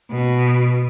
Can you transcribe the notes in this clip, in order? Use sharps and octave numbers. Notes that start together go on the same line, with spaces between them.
B2